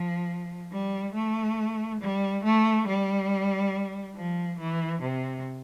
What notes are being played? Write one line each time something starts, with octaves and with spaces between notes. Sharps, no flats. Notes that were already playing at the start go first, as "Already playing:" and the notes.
Already playing: F3
G3
A3
G3
A3
G3
F3
E3
C3